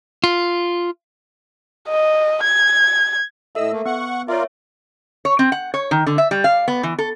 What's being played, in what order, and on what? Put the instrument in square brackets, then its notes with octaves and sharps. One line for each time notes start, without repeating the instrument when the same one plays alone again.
[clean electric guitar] F4
[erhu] D#5
G#6
[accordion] A2 D#5 E6 [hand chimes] A4 E5
[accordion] A3 A#3
[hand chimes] B3 [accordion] F#5 C#6
[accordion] F4 A#4 D5 [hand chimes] C#5 E5
[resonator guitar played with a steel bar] C#5
C4
F#5
C#5
D#3
D3
E5
G3
F5
B3
E3
A4